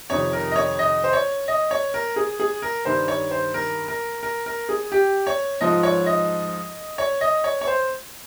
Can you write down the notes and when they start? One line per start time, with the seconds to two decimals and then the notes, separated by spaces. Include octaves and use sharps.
0.10 F2 C3 D#3 C#5
0.33 A#4
0.51 D#5
0.56 C#5
0.79 D#5
1.04 C5
1.13 C#5
1.48 D#5
1.71 C#5
1.94 A#4
2.16 G#4
2.40 G#4
2.62 A#4
2.85 G2 D#3 C5
3.08 C#5
3.31 C5
3.54 A#4
3.88 A#4
4.23 A#4
4.46 A#4
4.69 G#4
4.92 G4
5.27 C#5
5.61 G#2 F3 D#5
5.83 C#5
6.06 D#5
6.98 C#5
7.21 D#5
7.44 C#5
7.61 C#5
7.67 C5